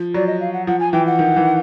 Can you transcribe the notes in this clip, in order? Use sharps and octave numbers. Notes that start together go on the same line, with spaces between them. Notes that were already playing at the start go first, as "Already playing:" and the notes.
Already playing: F3
F#3 D5
D#5
F5
F#5
F3 F#5
G#5
E3 G5
F#5
D#3
E3